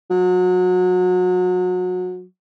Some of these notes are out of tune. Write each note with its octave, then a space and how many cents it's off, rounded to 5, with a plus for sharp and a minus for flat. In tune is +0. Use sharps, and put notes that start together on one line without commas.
F#3 -30